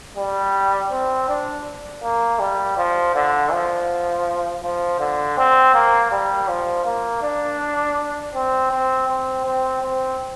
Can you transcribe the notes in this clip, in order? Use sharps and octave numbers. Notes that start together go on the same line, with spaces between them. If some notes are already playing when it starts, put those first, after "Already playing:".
G3
C4
D4
A#3
G3
F3
D3
F3
F3
D3
C4
A#3
G3
F3
A#3
D4
C4
C4
C4
C4
C4